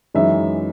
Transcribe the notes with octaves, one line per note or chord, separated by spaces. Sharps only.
F#2 E3 G#3 D#4 E5